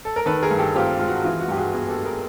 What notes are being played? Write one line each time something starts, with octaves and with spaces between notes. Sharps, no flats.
A4
A#4
D#3 A4 B4
G#4 A#4
G2
G4 A4
C4 F4 G4
G#3 F4
F#4
E3 F4
F#4
G2 G4
F#4 G#4
B3 F#4 G#4
G4 A4
G3
G#4 A#4